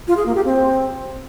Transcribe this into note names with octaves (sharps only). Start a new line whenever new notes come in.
F4
G#4
A#3
G4
C4